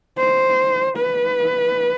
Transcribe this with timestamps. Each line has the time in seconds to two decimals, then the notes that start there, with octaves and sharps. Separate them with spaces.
0.18 C5
0.97 B4